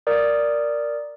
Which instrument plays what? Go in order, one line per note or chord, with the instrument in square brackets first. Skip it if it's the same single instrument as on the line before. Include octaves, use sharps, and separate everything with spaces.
[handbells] A#4 D5 D#6